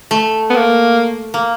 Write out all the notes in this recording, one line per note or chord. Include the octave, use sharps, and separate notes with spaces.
A3
B3
A#3
A#3